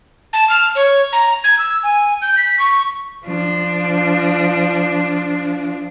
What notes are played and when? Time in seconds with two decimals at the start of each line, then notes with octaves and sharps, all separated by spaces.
0.33 A5
0.49 F6
0.75 C#5
1.13 A#5
1.44 G#6
1.58 E6
1.83 G#5
2.22 G6
2.37 B6
2.59 C#6
3.25 F3 D4